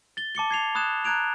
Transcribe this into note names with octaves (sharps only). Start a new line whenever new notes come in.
A6 G7
A5 D6 C#7 G7
G#6 C7 F7
B5 D#6 F#6 G#6 E7
A#5 F#6 G#6 D7 F7